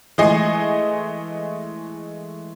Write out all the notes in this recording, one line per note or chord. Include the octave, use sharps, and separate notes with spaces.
E3 G#3 A3 D#5 G#5 C7